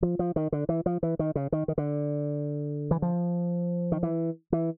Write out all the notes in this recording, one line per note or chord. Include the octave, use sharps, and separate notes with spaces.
F3
F3
D#3
D3
E3
F3
E3
D#3
C#3
D#3
D#3
D3
E3
F3
D#3
E3
E3